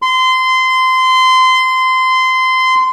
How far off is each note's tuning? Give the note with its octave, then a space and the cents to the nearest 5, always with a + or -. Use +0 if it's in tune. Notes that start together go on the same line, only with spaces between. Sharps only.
C6 -20